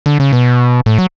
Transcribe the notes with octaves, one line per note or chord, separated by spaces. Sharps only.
D3
C#3
B2
A2
F#3